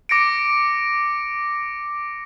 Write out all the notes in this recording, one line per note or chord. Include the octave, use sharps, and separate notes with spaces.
D6 A#6 C#7 D7